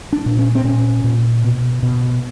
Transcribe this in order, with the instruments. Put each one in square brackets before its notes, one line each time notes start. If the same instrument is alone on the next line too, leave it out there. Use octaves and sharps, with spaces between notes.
[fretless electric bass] D4
A#2
C#4
C4
A#2 C#4
A#2
B2
B2